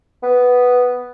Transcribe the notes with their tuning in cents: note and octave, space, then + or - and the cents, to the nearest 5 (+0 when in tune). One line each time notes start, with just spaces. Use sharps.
B3 +5